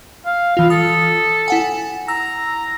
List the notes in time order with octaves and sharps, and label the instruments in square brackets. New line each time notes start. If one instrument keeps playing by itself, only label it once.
[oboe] F5
[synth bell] E3 F4 [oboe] F5
[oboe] A4 [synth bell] D#6
[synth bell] E4 F#5 G#5
[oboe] A#5 [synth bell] E6